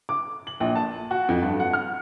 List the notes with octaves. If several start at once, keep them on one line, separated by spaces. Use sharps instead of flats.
D6
F#7
A#1
A5
F#4
F2
G2
F#5
F6